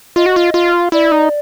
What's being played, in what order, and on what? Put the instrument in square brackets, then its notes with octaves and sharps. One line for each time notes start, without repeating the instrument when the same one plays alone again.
[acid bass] F4 [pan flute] D#5
[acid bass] F#4
F4
F4
[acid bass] E4 [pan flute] D5
[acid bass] D#4